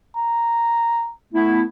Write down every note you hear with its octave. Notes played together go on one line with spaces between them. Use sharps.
A#5
A3 B3 E4